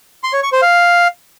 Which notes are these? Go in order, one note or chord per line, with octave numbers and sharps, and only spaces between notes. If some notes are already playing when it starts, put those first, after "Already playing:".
C6
C#5
C#6
C5
F5